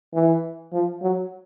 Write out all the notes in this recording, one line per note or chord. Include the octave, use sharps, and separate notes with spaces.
E3
F3
F#3